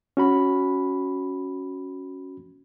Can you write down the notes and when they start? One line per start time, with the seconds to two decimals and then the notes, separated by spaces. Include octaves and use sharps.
0.17 C#4 F#4 B5